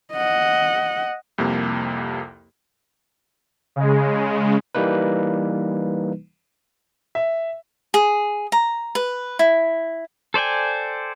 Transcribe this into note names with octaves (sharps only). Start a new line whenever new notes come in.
D#5 F#5
C2 F2 C3 A#3
C#3 G#3
E3 G3 A#3 D#4 B4
E5
G#4
A#5
B4
E4
A4 C5 D5 G5 G#5